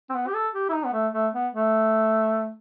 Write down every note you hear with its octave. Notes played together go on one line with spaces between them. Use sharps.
C4
B3
G4
A4
G4
E4
D#4
B3
A3
A3
B3
A3